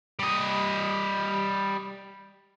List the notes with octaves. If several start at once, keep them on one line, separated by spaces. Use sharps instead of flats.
G3 D#5